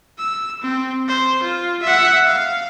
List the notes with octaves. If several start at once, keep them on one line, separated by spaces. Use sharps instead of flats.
E6
C4
C5
F4
E5 F#5
F5